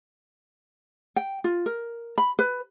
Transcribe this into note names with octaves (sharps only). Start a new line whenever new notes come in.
G5
F4
A#4
B5
B4